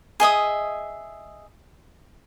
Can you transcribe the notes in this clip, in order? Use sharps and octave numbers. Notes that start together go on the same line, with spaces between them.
G#4 D#5 E5 D#6